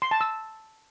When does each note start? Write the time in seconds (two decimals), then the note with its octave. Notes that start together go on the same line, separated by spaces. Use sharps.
0.02 C6
0.11 A5
0.21 E6